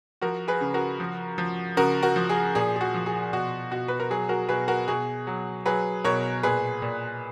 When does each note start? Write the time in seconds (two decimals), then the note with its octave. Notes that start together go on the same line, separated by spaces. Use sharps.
0.22 F3 F#4 A#4
0.48 G#4 B4
0.61 C#3
0.74 F#4 A#4
1.00 F3
1.38 F3
1.77 C#3 F#4 A#4
2.03 F#4 A#4
2.16 F3
2.29 G#4
2.55 A#2 G#4
2.76 G#4
2.81 F#4
2.94 F3
3.06 G#4
3.33 B2 F#4
3.71 B2 F#4
3.88 B4
4.00 A#4
4.10 F#3 G#4
4.29 F#4 A#4
4.49 B2 G#4 B4
4.68 F#4 A#4
4.88 B2 G#4
5.27 F#3
5.65 F#3 G#4 B4
6.05 B2 A#4 C#5
6.43 A#2 G#4 B4
6.82 A#2